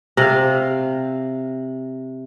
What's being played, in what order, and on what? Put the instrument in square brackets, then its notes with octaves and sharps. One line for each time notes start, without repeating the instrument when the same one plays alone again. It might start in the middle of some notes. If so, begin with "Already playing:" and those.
[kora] C3 F5